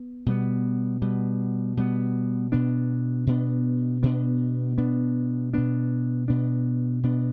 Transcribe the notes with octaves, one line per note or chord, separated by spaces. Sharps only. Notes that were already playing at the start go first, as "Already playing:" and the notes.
Already playing: B3
B2 G3 B3
B2 G3 B3
B2 G3 B3
B2 B3 D4
B2 B3 D4
B2 B3 D4
B2 B3 D4
B2 B3 D4
B2 B3 D4
B2 B3 D4